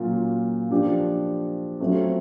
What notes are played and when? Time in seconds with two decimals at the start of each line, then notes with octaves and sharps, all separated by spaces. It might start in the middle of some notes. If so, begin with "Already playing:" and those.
Already playing: A#2 F#3 A#3 C#4 F4
0.71 F3 A#3 D4 G4
1.80 F#3 A3 C4 F4